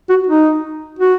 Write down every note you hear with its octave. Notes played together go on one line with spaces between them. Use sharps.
F#4
D#4
F#4